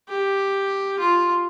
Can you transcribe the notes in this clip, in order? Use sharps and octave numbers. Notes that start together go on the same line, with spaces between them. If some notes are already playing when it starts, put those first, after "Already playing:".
G4
F4